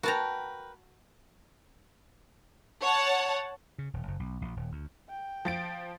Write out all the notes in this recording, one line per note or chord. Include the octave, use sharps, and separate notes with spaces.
F#4 A#4 B4 G5 A5 A#5
C#5 F#5 A5
C#3
D#1
F#1
B1
A#1
D#1
D2
G5
F3 A6 D7